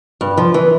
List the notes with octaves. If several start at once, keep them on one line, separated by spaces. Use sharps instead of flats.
G2
F3
E3